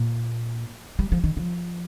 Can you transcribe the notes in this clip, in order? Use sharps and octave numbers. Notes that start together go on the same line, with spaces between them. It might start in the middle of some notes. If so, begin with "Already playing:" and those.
Already playing: A#2
G3
F3
D#3
F3